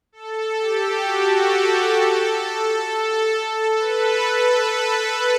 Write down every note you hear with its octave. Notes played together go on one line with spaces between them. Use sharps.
A4
G4
F#4
A4
B4